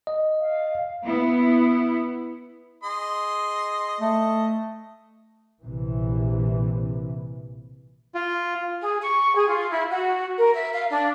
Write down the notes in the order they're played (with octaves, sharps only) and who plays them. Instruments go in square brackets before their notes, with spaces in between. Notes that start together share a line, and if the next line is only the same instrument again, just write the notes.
[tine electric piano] D#5
[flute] F5
[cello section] B3 E4
[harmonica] G#4 D#5 C6
[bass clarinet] A3 [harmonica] D#5
[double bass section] A#1 C3 E3
[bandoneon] F4
[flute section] G#4
C#6
G#4
F4
E4
F#4
A#4
E5
F5
D4